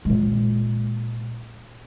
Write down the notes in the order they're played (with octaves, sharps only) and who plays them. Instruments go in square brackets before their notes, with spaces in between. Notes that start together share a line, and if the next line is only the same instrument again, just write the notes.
[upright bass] A#2 G#3